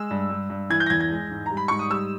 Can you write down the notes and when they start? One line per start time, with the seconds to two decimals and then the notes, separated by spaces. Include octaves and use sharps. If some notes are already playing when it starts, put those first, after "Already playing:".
Already playing: G#3 E6
0.10 G2
0.30 G2
0.50 G2
0.70 E3 G#6
0.80 G6
0.86 A#6
0.90 E2 G#6
1.00 G#6
1.11 G#3
1.31 G#2
1.46 G3 A#5
1.57 B5
1.68 G#2 C#6
1.79 D#6
1.90 G3 E6